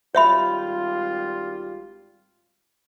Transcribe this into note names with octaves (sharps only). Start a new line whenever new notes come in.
G#1 G3 F4 C#5 E5 B5